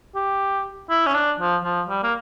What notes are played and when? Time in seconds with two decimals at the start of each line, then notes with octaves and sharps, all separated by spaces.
0.15 G4
0.90 E4
1.06 C#4
1.15 D4
1.40 F3
1.64 F3
1.89 G3
2.04 A#3